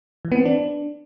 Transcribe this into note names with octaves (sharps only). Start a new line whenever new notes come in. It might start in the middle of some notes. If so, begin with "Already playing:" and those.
E3
B3
C4
D4